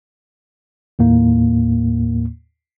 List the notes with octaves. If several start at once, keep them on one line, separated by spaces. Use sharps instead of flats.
D#2 A2 A#3